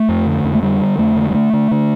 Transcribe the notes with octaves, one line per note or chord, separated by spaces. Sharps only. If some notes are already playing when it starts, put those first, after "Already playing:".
Already playing: A3
F2
D3
F2
A3
D3 G3
D3
F2 A3
D3
G3
D3 A3
D3
D3